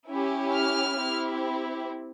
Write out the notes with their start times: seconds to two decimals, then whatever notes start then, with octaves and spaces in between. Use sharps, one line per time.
0.09 C#4 E4 G4
0.53 F6
0.98 C4 E4 G4